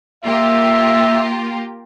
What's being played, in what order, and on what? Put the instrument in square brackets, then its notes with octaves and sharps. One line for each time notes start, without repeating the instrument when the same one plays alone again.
[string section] A#3 F4 G4 [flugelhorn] E5